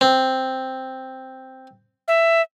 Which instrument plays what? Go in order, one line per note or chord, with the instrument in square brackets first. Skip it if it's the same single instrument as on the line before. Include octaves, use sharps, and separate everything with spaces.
[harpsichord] C4
[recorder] E5